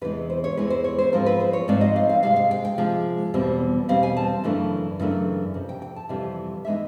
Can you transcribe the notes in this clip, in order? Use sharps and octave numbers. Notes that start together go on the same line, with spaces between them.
E2 C3 E3 G#3 B4
C5
C#5
E2 C3 E3 G#3 B4
C5
C#5
C5
G#2 F3 G#3 C4 A#4
B4
C5
C#5
G#2 F3 G#3 C4 D5
D#5
F5
F5
C3 F3 G#3 F5
F5
G5
G5
C3 F3 G#3
E2 B2 G3 C4
E2 B2 G3 C4 F5
G#5
A5
F#2 C#3 E3 A3 D4
F#2 C#3 E3 A3 D4
F2 C3
G5
G5
A5
F2 C3 E3 G3
E3 G#3 B3 D#4 E5